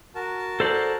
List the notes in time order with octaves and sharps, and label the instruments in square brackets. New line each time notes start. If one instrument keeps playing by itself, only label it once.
[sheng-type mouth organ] F#4 A#4 A5
[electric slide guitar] A4 C5 D5